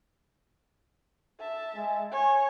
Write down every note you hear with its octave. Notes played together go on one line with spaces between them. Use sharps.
E5 A5
G#3
C#5 G#5